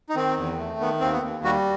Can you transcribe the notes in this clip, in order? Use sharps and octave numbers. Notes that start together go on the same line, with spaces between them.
D#4
D#3 C4
E2
A3
D#3 B3
D#2 C4
B3
D#2
G3 F#4